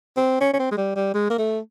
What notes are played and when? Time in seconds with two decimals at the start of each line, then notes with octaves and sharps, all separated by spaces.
0.17 C4
0.41 C#4
0.53 C#4
0.59 C4
0.71 G#3
0.77 G3
0.96 G3
1.14 G#3
1.30 A#3
1.38 A3